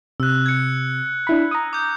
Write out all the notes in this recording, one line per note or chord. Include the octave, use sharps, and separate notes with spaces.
C3 E6 F#6
G#6 C#7
C#7
D4 E4 B5
A#5 D#6
D6 G6